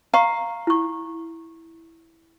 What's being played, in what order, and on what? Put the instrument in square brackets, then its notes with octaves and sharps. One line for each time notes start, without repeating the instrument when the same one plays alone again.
[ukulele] F5 [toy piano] A#5 C#6
[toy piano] E4 C#6